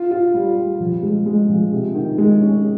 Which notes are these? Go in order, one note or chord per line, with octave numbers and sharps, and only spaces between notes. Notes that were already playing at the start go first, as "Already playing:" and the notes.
Already playing: F4
F4
G3
G3
F3
G#3
G#3
F3
C3
D#3
G#3
C#4